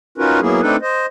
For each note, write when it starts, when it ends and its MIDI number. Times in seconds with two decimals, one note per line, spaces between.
0.18 0.40 61
0.18 0.40 63
0.18 0.40 65
0.18 0.40 66
0.18 0.40 70
0.18 0.40 71
0.40 0.61 54
0.40 0.61 58
0.40 0.61 59
0.40 0.61 64
0.40 0.61 68
0.62 0.76 57
0.62 0.76 60
0.62 0.76 62
0.62 0.76 63
0.62 0.76 69
0.62 0.76 71
0.82 1.06 72
0.82 1.06 75